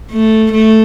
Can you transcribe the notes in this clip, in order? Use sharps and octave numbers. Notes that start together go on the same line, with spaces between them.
A3
A3